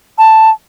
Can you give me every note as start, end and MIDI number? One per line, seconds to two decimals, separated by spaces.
0.18 0.50 81